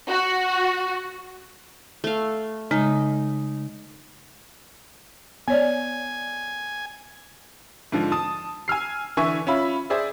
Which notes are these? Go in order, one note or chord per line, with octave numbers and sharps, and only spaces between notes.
F#4
A3 F5
C#3 G#3 D#4
B3 C#5 D5 G#5
G#2 D3 F3
A5 D#6
G#5 E6 F6 C7
D3 E3 E5 G#5 C#6
C#4 F4 E5 B5
G#4 C5 D5 E5